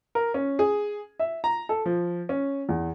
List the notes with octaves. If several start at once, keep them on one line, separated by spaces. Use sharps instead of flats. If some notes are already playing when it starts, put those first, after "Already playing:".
A#4
C#4
G#4
E5
A#5
A4
F3
C#4
E2